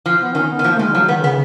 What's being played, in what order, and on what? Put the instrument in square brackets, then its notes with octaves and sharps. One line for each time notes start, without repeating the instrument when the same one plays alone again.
[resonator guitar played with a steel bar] F3
[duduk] B3
[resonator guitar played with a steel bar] D#3 [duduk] C#4
[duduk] B3
[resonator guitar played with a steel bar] D#3
[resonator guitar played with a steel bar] F3 [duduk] A#3
[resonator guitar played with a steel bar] D#3 [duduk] G#3
[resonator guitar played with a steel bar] F3 [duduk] F#3
[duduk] D#3 [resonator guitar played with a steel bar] B3
[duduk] C#3 [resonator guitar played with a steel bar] B3